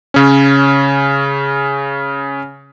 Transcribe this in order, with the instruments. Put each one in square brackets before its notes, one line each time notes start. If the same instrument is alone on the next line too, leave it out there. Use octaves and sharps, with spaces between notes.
[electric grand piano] C#3 C#4